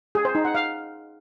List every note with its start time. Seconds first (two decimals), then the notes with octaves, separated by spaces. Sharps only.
0.15 G#4
0.25 C5
0.35 D#4
0.45 F#5
0.55 F5